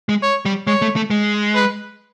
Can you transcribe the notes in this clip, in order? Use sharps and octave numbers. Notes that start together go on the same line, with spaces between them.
G#3
C#5
G3
G#3 C#5
A3
A3
G#3
B4